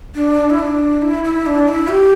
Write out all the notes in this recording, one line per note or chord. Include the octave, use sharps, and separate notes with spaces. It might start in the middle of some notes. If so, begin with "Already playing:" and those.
D4
E4
D4
E4
E4
D4
E4
G4